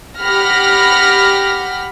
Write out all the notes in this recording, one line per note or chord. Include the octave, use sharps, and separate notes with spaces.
G4 F#5 B5 F6 A#6